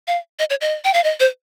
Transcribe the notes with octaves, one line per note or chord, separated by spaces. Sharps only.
F5
D#5
C#5
D#5
G5
F5
D#5
C5